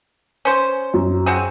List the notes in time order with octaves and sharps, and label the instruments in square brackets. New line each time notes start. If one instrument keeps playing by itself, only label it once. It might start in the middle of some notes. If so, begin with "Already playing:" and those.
[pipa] C#4 C5
[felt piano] F#2
[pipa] C4 F#4 G#4